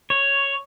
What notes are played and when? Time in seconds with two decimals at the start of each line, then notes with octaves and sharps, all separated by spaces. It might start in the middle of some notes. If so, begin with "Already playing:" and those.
0.10 C#5